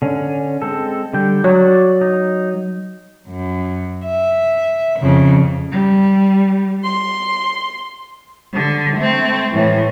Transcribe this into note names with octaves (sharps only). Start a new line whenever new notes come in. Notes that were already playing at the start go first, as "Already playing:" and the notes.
D3 C#4
G#3 C4 A4
D3 G3 G5
F#3 F#4 D5
D#4
F#2
E5
F2 C#3
G3
C6
D3
A3 C4
A2 E3